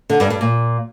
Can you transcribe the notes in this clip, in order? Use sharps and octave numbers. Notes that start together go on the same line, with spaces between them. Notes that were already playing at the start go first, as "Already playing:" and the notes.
D3
G2
G2
A#2